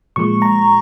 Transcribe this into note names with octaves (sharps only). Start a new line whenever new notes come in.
A#2 F3 G#3 C#6
A#5